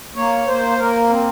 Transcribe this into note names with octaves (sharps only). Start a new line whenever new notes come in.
A#3 C#5
A#3 C5
A#3 A#4
C4